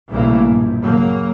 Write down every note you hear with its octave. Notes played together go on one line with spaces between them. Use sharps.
B1 A2 C#3 E3 G3 A#3
A#1 G2
C#3 F#3 A#3